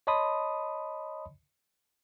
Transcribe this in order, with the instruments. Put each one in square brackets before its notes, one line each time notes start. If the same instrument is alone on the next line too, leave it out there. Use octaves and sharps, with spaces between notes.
[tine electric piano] C#5 D#5 A5 B5 C6 D#6